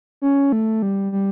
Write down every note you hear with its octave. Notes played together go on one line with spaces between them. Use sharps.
C#4
A3
G3
G3